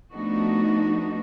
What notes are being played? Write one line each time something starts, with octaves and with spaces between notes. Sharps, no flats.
F3 A3 B3 D4 D#4 F#4